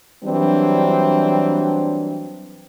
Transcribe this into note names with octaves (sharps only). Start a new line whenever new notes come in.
E3 F#3 G3 C4 D4